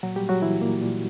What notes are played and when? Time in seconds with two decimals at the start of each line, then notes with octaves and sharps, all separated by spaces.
0.03 A#2 F#3 F#4
0.16 G3 G4
0.23 A#2
0.29 F#3 F#4
0.42 A#2 E3 E4
0.61 A#2 A#3
0.81 A#2